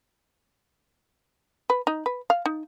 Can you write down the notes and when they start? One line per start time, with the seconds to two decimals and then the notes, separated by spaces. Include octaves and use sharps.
1.70 B4
1.87 D#4
2.06 B4
2.30 F5
2.46 D#4